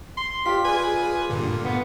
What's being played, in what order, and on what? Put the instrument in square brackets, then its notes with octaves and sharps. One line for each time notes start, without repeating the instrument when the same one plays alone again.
[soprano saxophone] C6
[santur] F4 D5 [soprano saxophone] G4 [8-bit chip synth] B6
[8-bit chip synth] G#4 B4 [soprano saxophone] G#5
[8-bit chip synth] G2 A#2 D3
[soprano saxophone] B3 [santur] D#6